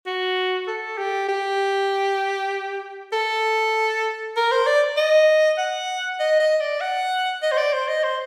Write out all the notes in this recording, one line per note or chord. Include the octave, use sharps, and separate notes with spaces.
F#4
A4
G4
G4
A4
A#4
C5
D5
D#5
F#5
D#5
D#5
D5
F#5
D#5
C5
D5
C5
D#5
C5